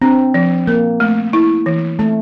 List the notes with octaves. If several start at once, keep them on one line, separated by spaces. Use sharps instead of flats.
C4 D4
F3
A#3 A#4
A3
E4
E3
A3 C4